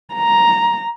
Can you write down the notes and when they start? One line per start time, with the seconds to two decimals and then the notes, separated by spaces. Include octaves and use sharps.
0.14 A#5